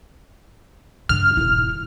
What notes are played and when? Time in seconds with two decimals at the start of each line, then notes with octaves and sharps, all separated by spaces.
1.09 G2 C#3 F6
1.37 D#1 E4